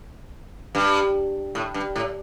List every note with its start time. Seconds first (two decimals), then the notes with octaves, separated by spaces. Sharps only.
0.75 G2
1.55 A2
1.74 G2
1.96 A2